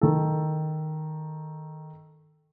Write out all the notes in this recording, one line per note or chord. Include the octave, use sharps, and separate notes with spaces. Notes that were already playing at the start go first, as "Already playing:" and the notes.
D#3 A4